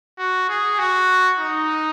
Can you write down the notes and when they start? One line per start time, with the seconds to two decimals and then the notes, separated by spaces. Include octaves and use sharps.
0.19 F#4
0.49 G#4
0.79 F#4
1.39 D#4